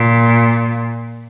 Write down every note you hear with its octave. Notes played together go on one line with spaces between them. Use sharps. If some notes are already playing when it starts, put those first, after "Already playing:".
Already playing: A#2